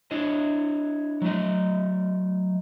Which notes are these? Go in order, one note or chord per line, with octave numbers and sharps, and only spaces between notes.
D4 E4 C#5 D#5
F#3 A3 D#5